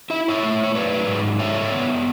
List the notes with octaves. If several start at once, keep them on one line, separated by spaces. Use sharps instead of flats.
E4 E5
C#5 E5
A3
C#5
F#3 B4 D5
G#2
D4 C#5 E5
B3